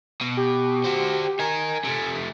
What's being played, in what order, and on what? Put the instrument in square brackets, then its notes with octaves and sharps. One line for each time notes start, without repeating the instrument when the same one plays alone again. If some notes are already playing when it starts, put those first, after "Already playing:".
[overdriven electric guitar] B2
[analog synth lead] G4
[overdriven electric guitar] F#4 C5
[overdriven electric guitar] D#4 A#4 [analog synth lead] G#5
[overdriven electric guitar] C3 A3